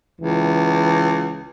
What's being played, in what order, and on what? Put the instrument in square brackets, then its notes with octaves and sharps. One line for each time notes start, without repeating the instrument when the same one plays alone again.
[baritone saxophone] C#2 [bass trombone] E3